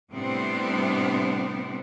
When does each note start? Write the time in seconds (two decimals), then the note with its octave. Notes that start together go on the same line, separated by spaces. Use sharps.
0.12 A2 C3 G3 B3 C4 D4